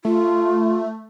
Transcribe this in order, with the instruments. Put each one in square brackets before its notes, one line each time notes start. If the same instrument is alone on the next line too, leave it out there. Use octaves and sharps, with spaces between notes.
[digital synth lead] A3 [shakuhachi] F4